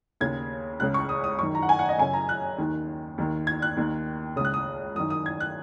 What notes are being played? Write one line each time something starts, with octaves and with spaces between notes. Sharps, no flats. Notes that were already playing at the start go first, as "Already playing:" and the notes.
D#2 C#3 G#6
C#2 C#3 F#6
C#6
D#6
D#6
F#2 D#3 C#6
A#5
F#5
G#5
F#5
D#5
F#2 C#3 G#5
A#5
F#6
D#2 D#3
D#2 D#3
G#6
F#6
D#2 D#3
C#2 C#3 D#6
F#6
D#6
F#2 D#3 D#6
D#6
G#6
F#6